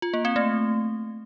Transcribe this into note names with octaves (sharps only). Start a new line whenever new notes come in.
F4
A#3
C4
A3